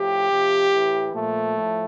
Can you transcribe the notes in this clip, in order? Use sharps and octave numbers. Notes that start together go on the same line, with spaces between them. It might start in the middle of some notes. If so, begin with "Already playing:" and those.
Already playing: A2 F3 G4
C3 F3
A2 E3
A#2 F3 A3
A2 F3